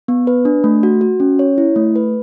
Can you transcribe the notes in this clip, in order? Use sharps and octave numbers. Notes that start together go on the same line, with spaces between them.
B3
B4
D4
A3
F#4
F#4
C#4
C#5
E4
A3
B4